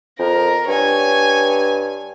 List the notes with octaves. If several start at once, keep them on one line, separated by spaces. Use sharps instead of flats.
F2 A#4
G2 C#5 G#5